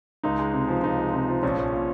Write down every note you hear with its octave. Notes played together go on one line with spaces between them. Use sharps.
C#2 D#4
G#3
C3
F3
C#2 D#4
G#3
C3
F3
A#1 C#4
A#1
A#2